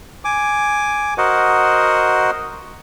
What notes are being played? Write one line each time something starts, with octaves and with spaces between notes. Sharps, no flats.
G#5 D6
F#4 A#4 C5 D#5 F#5